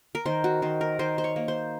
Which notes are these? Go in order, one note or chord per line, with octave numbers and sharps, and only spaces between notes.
A#4
D#3 C5
F#4
D#3 C5
A#4
D#3 C5
C5
C#5
A#3
C5